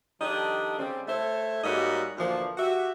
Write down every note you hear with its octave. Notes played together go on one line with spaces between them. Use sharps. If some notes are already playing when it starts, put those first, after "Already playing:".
D#3 F3 G3 D4 A4 D#5
C#3 G3 C4
A3 A4 C5 C#5 E5
G#2 G3 A#3 F#4 C#5 D#5
D2 A#2 E3 F3
F#4 G4 E5